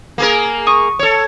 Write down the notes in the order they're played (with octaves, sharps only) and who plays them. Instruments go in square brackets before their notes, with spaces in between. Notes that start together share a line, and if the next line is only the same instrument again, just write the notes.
[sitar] A#3 G#4 A#4
[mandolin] C#6 D#6
[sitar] A4 C#5